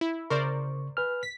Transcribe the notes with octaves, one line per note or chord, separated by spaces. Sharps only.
E4
C#3 A#4 C5 D5 C#6
B4 G#5 F6
B6